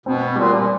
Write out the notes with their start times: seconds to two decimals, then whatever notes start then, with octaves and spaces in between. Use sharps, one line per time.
0.06 B2 C4
0.35 A#2 G3
0.56 A#2